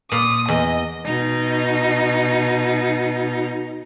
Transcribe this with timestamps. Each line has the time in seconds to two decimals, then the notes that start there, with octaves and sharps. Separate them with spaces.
0.12 A#2 D#6
0.48 E2 D#5
1.05 B2 D#4